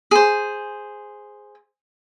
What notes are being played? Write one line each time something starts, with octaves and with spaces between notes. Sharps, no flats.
G#4 C5